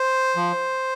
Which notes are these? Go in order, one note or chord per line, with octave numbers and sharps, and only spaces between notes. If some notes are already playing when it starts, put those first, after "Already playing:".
Already playing: C5
F3